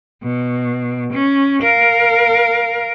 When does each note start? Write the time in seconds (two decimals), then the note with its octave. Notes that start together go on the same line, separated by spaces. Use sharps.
0.23 B2
1.13 C#4
1.62 A#4 F5